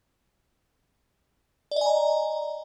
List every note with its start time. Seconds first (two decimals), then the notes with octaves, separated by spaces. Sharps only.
1.71 D5
1.76 D#5
1.81 G#5
1.86 A#5